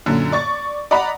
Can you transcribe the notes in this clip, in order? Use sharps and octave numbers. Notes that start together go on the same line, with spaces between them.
F#2 A#2 D3
D5 C#6 A6
D5 D#5 F#5 A#5 B5